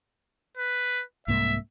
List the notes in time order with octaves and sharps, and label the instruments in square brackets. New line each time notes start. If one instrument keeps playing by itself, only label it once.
[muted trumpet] B4
[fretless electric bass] C2 G#2 A#3 [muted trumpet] E5